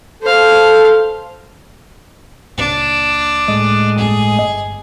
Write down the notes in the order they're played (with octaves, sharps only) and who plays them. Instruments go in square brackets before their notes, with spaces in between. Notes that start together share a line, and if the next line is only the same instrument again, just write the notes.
[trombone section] A4 [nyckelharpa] C5 F5
[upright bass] C#2 A#2 [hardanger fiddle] D4
[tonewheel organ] A2 G#3 D#5
[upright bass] G1 G2 [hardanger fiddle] G#4